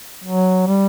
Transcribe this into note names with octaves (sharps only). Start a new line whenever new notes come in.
F#3
G3